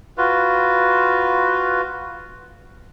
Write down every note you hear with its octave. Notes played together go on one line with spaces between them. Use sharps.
F4 F#4 B4